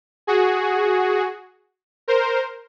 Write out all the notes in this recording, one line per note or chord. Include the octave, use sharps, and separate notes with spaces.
F#4 G#4
A#4 C5